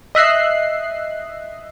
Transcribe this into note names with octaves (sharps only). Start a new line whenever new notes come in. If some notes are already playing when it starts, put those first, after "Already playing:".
D#5 E5 F#6 C7